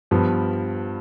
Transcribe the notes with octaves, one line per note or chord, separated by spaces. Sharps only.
G2 F3 B3